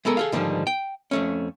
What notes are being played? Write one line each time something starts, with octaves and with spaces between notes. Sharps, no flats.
G#3 B3 A4 A#4
G#4 A4 F5
G#2 D3 D#3 F3 G3
G5
F2 A3 C#4